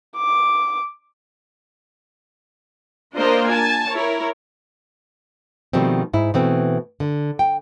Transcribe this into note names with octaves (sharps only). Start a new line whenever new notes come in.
D6
A#3 D4 F4 A#4 C5 D#5
G#5 A5
E4 A#4 C#5
B2 D#3 F3 G3 A3 C4
G#2 E4
B2 E3 A3 C4
D3
G5